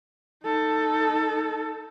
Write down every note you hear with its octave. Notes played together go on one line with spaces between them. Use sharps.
D#4 A4